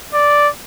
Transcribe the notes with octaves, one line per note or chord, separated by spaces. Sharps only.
D5